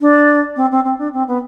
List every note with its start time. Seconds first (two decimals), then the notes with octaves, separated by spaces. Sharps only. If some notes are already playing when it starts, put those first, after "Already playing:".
0.01 D4
0.56 C4
0.71 C4
0.84 C4
0.98 D4
1.13 C4
1.27 B3